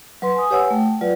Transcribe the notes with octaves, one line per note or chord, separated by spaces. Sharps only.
F#3 B4 C6
G#5 D#6
G4 B4 C#5 F#5 G#5 E6
A3 G5
F#3 F4 B4 D5